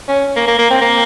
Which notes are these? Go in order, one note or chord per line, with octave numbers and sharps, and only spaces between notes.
C#4
A#3
A#3
A#3
C4
A#3